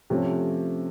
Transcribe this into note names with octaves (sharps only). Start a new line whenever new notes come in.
C3 F3 A3 C#4